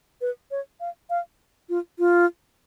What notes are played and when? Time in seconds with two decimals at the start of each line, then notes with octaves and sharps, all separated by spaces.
0.21 B4
0.51 C#5
0.80 F5
1.10 F5
1.69 F4
1.99 F4